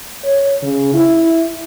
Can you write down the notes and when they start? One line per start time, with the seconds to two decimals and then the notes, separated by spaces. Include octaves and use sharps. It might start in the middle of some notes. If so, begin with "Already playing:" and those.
0.24 C#5
0.62 C#3
0.94 E4